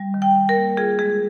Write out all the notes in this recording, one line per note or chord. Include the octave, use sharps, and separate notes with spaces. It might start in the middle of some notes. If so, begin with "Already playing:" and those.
Already playing: G3
D#3
G5
D#3
A#4
A#3
F4 G#4
G#3 G#4